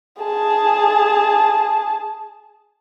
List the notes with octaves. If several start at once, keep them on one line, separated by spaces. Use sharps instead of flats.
G#4 A5